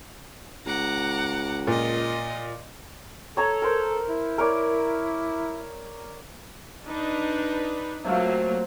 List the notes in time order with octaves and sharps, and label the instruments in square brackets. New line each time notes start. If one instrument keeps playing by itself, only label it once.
[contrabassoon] C#2 [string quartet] F#5 A#5 D6
[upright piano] A#2 [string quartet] F4 D#5
[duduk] A4 [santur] C#5 A#5
[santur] A#4 C5
[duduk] E4
[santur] A#4 C#5 D5
[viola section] D4 D#4 B4
[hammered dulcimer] C3 A3 F4 [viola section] F#3 A#3